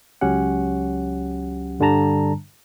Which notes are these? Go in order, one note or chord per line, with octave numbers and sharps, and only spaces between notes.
C#2 F#3 C#4 G4 F#5
G2 D3 G3 D4 A5 A#5